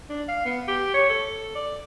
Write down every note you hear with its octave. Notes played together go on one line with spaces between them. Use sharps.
D4
F5
B3
G4
C#5
A4
D5